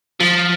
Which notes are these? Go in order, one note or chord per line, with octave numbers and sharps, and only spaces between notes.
F3